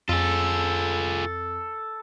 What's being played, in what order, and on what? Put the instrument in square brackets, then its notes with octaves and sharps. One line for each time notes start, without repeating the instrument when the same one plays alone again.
[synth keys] F2 [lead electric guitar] F4 G#4 [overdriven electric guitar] A4